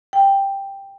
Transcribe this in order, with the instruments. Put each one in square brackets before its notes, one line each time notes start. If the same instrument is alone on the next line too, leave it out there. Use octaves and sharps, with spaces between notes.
[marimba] G5